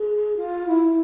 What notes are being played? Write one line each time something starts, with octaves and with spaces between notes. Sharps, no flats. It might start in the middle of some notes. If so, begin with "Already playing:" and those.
Already playing: G#4
F4
E4